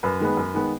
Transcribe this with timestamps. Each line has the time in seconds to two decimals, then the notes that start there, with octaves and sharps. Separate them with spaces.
0.03 F#2 B4
0.20 D#3 G#3 B3
0.37 F#2
0.54 D#3 G#3 B3